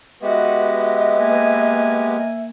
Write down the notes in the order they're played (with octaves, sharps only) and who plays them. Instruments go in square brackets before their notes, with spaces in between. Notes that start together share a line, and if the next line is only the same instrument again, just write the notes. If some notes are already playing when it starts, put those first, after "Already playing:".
[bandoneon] G#3 B3 G4 [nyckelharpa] F#4 [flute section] B4 D#5 [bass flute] E5
[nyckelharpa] A#3 G#5